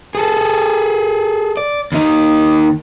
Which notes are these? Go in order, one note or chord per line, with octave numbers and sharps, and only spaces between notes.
G#4 A4
D5
D#2 D#4